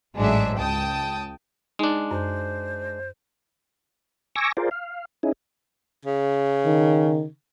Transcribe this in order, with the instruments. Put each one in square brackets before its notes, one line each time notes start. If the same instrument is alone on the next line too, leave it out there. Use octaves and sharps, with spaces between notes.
[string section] A1 G#2 F#3 G#3 D4 E5
C#2 G5 A5 D#6
[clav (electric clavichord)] G#3 D4 [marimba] D#4
[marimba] F#2 [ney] C5
[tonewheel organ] G#5 C#6 D6 E6 A#6
F4 G#4 A#4 C5 D5
F5
C#4 D#4 E4 G#4
[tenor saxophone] C#3
[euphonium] D#3